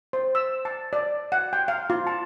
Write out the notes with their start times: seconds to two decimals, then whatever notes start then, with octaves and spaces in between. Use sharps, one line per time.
0.13 C5
0.35 E6
0.65 A5
0.93 D5
1.32 F#5
1.53 G5
1.68 F5
1.90 F4
2.07 A5